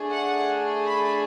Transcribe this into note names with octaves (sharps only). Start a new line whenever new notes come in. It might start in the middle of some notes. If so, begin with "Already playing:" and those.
Already playing: A3 D4 G#4
F#5
B5